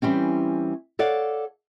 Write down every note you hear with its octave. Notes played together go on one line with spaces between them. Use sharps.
E3 F3 G3 C4 C#4
A4 C#5 D5 F5 F#5